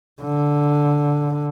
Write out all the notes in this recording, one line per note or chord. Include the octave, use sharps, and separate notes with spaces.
D3